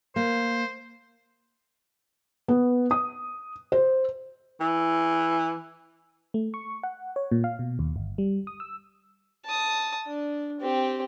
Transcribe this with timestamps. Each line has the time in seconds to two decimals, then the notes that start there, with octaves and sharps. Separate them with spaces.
0.16 A#3 C5
2.48 B3
2.91 D#6
3.72 C5
4.60 E3
6.34 A3
6.54 C#6
6.83 F#5
7.16 C#5
7.32 A#2
7.44 F5
7.59 B2
7.79 D#2
7.96 G1
8.18 G3
8.47 D#6
8.60 E6
9.45 A5 D#6
10.07 D4
10.60 C4 G4